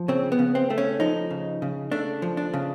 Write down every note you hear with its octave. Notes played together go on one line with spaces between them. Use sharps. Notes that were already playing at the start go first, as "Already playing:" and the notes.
Already playing: F3
C#3 C4
B3
C#3
C4
A3
C#4
F3 D#4
C#3
C#3
A3 D4
F3
D4
C#3